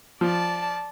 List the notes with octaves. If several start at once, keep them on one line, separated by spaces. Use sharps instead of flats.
F3 D5 A5